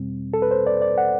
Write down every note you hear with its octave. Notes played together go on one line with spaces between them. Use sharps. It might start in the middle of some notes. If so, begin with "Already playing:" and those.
Already playing: E2 B2 G3 C4
A4
B4
C5
D5
D5
F#5